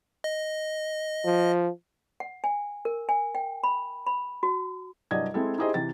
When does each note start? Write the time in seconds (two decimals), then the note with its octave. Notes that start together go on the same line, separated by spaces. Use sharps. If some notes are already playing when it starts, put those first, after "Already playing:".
0.24 D#5
1.24 F3
2.20 F#5
2.44 G#5
2.85 A#4
3.09 G#5
3.35 G5
3.64 B5
4.06 B5
4.43 F#4
5.11 C2 G2 F#3 D5 D#5 G#6
5.34 G#3 C4 E4 A4
5.58 D#4 E4 G4 G#4 C5 D#5
5.74 C3 E3 A6